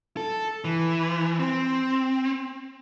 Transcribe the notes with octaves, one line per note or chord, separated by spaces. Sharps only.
A4
E3
C4